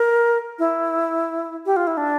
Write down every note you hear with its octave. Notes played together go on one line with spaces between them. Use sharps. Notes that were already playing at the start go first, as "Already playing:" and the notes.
Already playing: A#4
E4
G4
F4
E4
D4